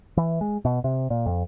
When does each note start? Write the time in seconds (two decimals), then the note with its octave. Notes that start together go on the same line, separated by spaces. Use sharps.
0.17 E3
0.41 G#3
0.65 B2
0.84 C3
1.10 A#2
1.26 F2